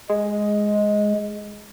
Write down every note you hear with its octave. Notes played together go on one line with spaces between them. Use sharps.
G#3 D#5